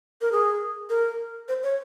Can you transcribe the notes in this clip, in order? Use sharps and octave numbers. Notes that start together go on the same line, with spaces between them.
A#4
G#4
A#4
C5
C#5